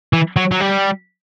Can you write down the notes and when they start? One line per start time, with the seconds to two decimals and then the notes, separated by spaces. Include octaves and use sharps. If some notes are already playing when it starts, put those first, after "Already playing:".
0.13 E3
0.37 F#3
0.51 F#3
0.61 G3